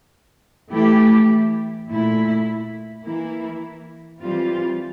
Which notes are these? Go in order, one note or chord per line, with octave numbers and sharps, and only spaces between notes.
E3 A3 E4 G4
A#2 A3 E4
E3 A#3 E4
E3 G3 C4 F4